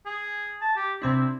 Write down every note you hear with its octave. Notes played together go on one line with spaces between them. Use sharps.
G#4
A5
G4
C3 C4 D4 E4